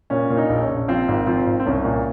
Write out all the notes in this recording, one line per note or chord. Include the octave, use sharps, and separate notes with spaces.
A#2 C#4
A#2
D#4
A#1
C#4
A#1
F3 C4
G#1
F3 C4
G#1
C4
C2 C#4
A#2